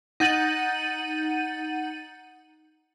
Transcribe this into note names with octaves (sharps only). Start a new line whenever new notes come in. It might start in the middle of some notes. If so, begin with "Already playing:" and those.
D#4 F#5 G6 A6 D#7 F#7